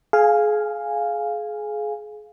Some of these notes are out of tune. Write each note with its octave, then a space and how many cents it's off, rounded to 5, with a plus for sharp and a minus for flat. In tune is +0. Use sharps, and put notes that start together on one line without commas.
G#4 +30 F5 +0 G#5 -10